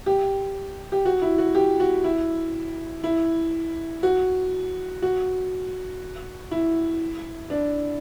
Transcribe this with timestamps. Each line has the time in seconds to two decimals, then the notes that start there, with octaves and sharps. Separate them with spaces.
0.06 G4
0.92 G4
1.05 F#4
1.22 E4
1.38 F#4
1.55 G4
1.80 F#4
2.04 E4
3.04 E4
4.03 F#4
5.02 F#4
6.51 E4
7.50 D4